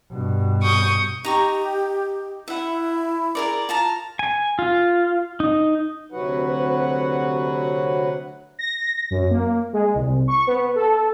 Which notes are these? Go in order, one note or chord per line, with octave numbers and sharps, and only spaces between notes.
G2 B2
C#6 D#6 G6
D#4 G4 A#5 C#6
E4 E5 F#5
G#4 A#4 D5
F4 A5 A#5
G#5
F4
D#4
D2 C3 F#3 F#4 B4 F#5
A#6
F#2
A#3
G#3
C2
C#6
B3
A4